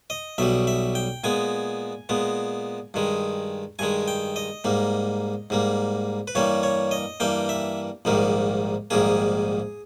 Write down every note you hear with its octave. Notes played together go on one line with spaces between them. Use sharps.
D#5
B1 B2 G3 E5
E5
G5
A#2 G#3 B3 G#5
A#2 G#3 B3
G2 D#3 G#3
G2 D#3 G#3 G#5
G5
D#5
G#2 G3 A#3
G#2 G3 A#3
B4
G2 E3 G3 A#3 C#5
C#5
D#5
G2 E3 G3 A#3 G5
E5
A#1 G#2 D#3 G3 A#3
A#1 G#2 D#3 G3 A#3 G#4